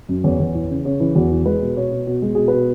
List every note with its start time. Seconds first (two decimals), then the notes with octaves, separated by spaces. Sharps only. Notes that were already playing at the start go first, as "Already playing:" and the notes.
0.09 F#2
0.24 E2 C#5
0.39 E2
0.55 E3
0.70 C#3
0.85 C#3 C#5
1.00 E3
1.15 E2 F#4
1.31 E3
1.46 G#3 B4
1.61 B2
1.76 B2 C#5
1.91 B2
2.07 B2
2.22 G#3 F#4
2.35 B2 G#4
2.48 B4
2.53 B2